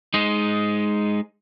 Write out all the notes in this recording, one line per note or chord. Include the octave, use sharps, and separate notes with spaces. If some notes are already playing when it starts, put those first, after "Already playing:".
G#3 D#4